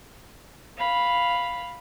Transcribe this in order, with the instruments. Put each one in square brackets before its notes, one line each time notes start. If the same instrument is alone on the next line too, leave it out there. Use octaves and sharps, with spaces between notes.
[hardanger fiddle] F5 B5